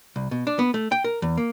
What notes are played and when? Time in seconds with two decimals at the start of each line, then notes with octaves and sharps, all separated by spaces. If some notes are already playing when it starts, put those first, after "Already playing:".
0.16 C2
0.31 B2
0.47 D4
0.59 B3
0.74 A3
0.92 G5
1.04 A#4
1.22 E2
1.37 A#3